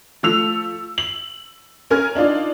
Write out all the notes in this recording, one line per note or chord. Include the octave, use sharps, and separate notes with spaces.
F3 A3 E6 F7
F#7
C#4 A#4 G#5 F6 G#6
D4 D#4 F4 D5